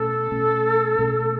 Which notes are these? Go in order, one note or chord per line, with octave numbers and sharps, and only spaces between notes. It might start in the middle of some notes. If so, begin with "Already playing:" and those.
Already playing: B2 A3 C#4 A4
B2 A3 C#4
B2 A3 C#4